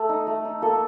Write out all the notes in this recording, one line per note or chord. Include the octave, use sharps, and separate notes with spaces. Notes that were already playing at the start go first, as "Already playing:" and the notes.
Already playing: A3 A4
D#4
A3
D#4
A#3 A4